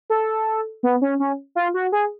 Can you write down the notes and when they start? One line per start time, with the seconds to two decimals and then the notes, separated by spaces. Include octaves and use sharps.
0.10 A4
0.83 B3
1.02 C#4
1.20 C#4
1.55 F4
1.74 F#4
1.92 G#4